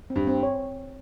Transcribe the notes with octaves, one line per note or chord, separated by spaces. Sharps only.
C4
G2
C4
C#5